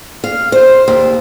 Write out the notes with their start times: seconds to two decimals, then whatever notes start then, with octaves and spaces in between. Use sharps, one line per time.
0.24 F5
0.52 C5
0.88 D#2